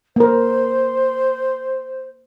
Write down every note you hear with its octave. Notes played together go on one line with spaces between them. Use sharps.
A#3 A#4 C5